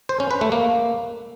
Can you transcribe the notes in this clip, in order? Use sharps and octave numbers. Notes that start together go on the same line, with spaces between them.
C5
C#4
B4
A3
A#3